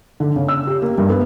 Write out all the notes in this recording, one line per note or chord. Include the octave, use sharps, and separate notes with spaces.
D3
C#3
E6
G4
A#3
G2
B3